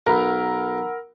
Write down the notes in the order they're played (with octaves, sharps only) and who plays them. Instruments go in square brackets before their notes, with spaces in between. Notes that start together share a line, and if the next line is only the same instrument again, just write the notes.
[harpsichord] B1 [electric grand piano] A#4 B5 [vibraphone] F#5 E6 [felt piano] A#5